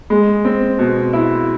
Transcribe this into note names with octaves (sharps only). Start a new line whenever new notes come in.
G#3
C4
B2
E4